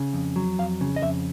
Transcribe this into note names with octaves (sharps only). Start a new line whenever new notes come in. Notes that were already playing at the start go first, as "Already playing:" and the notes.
Already playing: C#3
F2
F#3
F2 F5
C#3
D#5
F2 E5